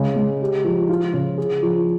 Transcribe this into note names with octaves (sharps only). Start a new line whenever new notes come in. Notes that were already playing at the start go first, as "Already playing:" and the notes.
Already playing: C#3 G#3
G#3
G4
F3
F4
C#3
G#4
F3